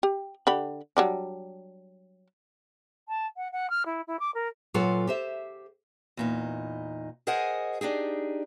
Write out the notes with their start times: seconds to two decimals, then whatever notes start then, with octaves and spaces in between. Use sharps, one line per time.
0.03 G4
0.47 D3 G4 B5
0.97 F#3 G3 D4
3.08 A5
3.36 F#5
3.52 F#5
3.69 F6
3.85 E4
4.07 E4
4.19 D6
4.34 A#4
4.74 A#2 F#3 F4 A4 B4 F#5
5.07 G4 C5 E5
6.17 E2 A#2 D#4
7.27 G#4 A#4 C5 D#5 F#5 G#5
7.81 D4 D#4 G4 G#4